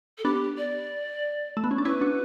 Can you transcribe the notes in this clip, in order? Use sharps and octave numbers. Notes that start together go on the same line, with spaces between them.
A4
B3 D4 G4
D5
A3
B3
C#4
D4
C#4 E4 B4
D4 F#4